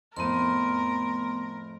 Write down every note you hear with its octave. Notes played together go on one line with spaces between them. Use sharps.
F2 A2 A3 B3 A#4 C6